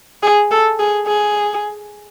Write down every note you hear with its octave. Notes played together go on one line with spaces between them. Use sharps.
G#4
A4
G#4
G#4